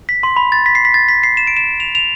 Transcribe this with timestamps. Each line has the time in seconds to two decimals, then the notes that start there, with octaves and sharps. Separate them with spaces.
0.09 B6
0.23 C6
0.36 B5
0.52 A6
0.66 B6
0.75 C7
0.85 B6
0.94 A6
1.08 B6
1.23 C7
1.37 E7
1.47 D7
1.57 E7
1.80 F7
1.95 F7